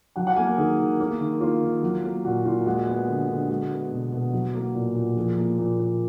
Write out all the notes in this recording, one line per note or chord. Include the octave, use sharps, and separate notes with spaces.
F#3 F#5
F#5
A#3 G#5
A#4
D#3 G#4
D#3
A#3
D#3
A#3 F4
D#3
F#3
A#3
A#2 F#4
A#2 F4
G#3 F#4
B3
D3
D3
G#3 F#4
B3
B2
B2
F#3 F#4
A#3
A#2
A#2
F3 G#4
A#3
A#2
A#2